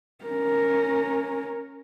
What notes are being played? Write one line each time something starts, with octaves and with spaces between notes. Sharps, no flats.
C#4 A#4